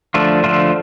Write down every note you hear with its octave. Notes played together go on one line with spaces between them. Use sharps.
D3 F3 A3 D4 F4
D3 F3 A3 D4 F4